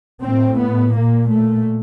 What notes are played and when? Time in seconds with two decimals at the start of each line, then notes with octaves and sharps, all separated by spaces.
0.23 A2 C4
0.59 B3
0.95 A#2 A#3
1.30 A3